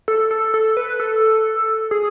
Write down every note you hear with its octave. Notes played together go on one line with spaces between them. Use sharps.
A4
A4
A4
B4
A4
G#4